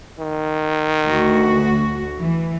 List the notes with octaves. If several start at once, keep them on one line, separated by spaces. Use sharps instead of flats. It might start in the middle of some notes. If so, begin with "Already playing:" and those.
D#3
D2 F#4
E3